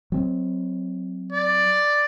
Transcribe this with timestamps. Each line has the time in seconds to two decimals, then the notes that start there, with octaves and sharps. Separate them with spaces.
0.12 F#3 C4
1.33 D5